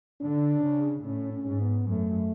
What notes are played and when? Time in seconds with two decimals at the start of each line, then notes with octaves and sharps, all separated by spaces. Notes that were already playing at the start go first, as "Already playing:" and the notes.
0.21 D3 D4
0.63 C#3
1.05 A2 C#4
1.34 C#4
1.47 G#2
1.61 B3
1.89 F#2 A3